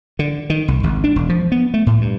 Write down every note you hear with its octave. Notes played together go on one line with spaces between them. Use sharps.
D3
D#3
C2
G#1
D4
E1
F3
B3
A3
A2
G2